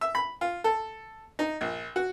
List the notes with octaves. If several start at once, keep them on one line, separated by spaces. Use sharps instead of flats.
E5
B5
F4
A4
D#4
A#1
F#4